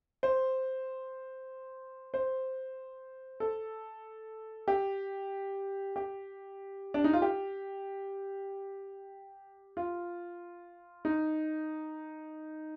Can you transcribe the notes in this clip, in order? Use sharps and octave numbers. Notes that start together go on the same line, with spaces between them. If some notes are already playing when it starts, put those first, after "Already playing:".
C5
C5
A4
G4
G4
D4
D#4
F4
G4
F4
D#4